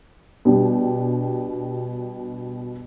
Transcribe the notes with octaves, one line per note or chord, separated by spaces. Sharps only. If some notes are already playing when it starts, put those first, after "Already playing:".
B2 G3 D4 G4